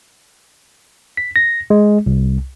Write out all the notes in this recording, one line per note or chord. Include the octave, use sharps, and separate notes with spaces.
B6
A#6
G#3
C2